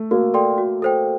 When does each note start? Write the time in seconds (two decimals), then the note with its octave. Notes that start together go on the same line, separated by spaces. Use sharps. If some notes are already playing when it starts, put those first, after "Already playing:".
Already playing: A3
0.11 A#3 F#4
0.34 A4 D5 G5 C6
0.58 F#4
0.82 A4 C5 G5